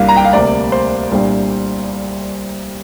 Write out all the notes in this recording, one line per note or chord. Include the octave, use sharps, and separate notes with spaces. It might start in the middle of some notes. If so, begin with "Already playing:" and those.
Already playing: C2 A#2 G3 A#3 D4 F5
A#5
G5
F5
D2 C3 A#3 D5
C5
C2 A#2 G3 D4